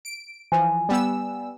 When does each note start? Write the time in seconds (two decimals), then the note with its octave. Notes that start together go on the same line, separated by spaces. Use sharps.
0.05 D7
0.52 E3 F3 G#5
0.89 G3 B3 E6